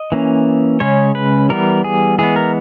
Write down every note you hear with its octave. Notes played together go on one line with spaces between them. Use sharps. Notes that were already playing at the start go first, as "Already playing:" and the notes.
Already playing: D#5
E3 A#3 C#4
C#3 G#3 C#4 C#5
B4
E3 G3 B3 A#4
G#4
E3 G#3 B3 G#4
A#4